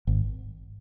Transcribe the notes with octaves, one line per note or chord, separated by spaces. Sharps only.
G#1